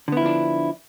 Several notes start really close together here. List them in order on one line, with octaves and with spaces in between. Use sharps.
D3 B3 E4 F3 D4